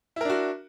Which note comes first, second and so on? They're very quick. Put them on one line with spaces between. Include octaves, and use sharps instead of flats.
E4 A#4 D4 F#4